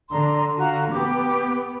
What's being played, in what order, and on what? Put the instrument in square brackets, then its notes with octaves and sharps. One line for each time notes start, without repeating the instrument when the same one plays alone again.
[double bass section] D3 [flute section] D4 A#5 C6
[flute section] F4 F#4 A#5
[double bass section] B3 [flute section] G4 D6